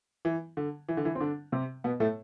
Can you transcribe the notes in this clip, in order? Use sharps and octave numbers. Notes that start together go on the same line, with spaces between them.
E3
D3
E3
D3
E3
C4
D3 D4
C3 C4
B2 B3
A2 A3